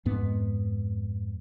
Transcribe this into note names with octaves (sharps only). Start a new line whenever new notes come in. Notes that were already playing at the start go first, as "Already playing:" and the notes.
F2 G#2 B3